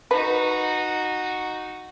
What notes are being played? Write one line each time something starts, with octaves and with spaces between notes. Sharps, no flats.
D#4 F#4 B4